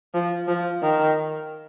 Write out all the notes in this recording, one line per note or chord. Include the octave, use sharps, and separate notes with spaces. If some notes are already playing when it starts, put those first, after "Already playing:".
F3
F3
D#3